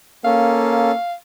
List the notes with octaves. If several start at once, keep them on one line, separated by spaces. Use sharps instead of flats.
A#3 C#4 A4 F5